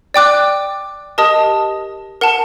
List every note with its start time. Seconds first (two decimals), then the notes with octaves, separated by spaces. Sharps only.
0.14 D5 G5 D6 F#6
1.18 G4 A#4 D#5 A5 D#6
2.21 A#4 F#5 A5